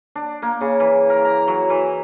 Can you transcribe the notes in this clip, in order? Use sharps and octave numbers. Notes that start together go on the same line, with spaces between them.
D4
A#3
C#3
E3
A#4
A#5
F#3
E3